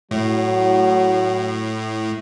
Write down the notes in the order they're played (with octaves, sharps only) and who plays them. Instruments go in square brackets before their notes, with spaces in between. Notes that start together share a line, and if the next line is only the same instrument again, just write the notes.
[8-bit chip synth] A2 [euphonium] F#3